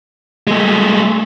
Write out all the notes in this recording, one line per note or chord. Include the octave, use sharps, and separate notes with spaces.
G#3 A3